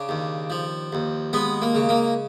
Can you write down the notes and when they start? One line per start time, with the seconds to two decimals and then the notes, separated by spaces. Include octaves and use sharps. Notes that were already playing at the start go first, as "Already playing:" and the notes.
Already playing: C#3 D4
0.09 D#2
0.50 F3
0.93 D#2
1.33 G#3 B3
1.62 A#3
1.75 C#3
1.89 A#3